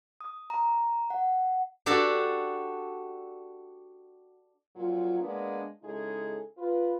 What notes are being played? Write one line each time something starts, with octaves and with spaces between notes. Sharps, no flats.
D#6
A#5
F#5
D4 F#4 G4 A4 D5 A5
F2 A#2 F#3 F4
G#3 A#3 B3 D4
C#3 G#3 D#4 E4 G#4 A4
F4 B4